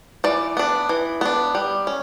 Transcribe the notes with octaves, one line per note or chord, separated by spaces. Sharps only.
E3 D5
B3 D4
E3
B3 D4
G3
C#4